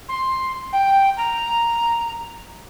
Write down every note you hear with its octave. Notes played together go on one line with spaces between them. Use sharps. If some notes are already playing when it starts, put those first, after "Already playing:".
C6
G5
A#5